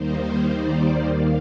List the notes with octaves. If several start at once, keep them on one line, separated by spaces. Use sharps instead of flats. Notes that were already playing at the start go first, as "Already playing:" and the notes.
Already playing: D#2 D#3 G3 A#3 D#4 C5
D5
D#2 D#3 A#3 F5